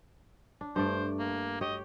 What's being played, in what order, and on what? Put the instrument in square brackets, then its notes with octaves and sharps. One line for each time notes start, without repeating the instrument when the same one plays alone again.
[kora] D4
[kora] G2 A3 D5 [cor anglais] C5
[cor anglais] A#3
[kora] G4 C#5 G5 [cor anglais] D#5